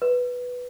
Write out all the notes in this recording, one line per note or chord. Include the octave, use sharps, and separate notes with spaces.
B4